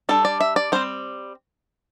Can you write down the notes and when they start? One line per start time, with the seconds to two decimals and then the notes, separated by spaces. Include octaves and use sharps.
0.09 G3 D4 A4
0.25 D5
0.41 E5
0.56 D5
0.72 G3 C4 C5